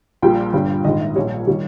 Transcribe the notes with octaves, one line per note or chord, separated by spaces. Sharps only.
A#1 A#2 G3 G5
G1 G2 G3
A#1 G#2 D#3 D#5
E5
A#1 A#2 G3 C#5
D#3 G3